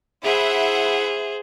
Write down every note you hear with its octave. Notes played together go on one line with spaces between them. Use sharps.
E4 G#4 C5 E5 F#5